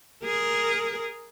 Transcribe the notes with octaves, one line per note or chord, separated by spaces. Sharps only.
G#4 A#4